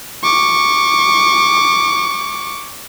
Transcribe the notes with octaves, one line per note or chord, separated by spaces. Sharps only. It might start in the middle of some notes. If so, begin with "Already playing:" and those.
C#6 D6